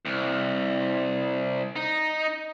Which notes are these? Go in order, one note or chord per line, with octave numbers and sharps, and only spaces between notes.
C2
D#4